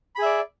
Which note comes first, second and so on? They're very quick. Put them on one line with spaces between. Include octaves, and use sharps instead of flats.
B5 G#4 E5 D5